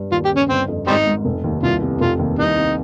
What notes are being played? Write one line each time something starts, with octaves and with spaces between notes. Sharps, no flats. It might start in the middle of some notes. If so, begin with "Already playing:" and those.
Already playing: G2
D#2 F4
G4
C#3
C#4
G1 C4
F2
G#1 G3 C4 D#4
G#2
F1
D#2
C2 F4
C3
F1 F4
D#2
C2 D#4
C3